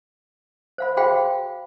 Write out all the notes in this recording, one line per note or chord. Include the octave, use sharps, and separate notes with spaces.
C5 F5 B5
F#4 G#4 C5 F5 G5 B5